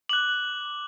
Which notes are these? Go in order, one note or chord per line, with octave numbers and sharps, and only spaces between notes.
D6 F#6 F#7